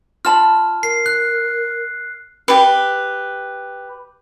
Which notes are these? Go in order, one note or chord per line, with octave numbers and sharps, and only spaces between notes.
F4 A5 B5 F6
A#4 C7
F#6
G4 B4